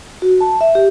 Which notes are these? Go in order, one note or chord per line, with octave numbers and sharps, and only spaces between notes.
F#4
A5
E5
G4